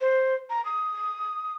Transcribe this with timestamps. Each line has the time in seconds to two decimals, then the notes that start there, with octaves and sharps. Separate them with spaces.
0.01 C5
0.50 A#5
0.65 D#6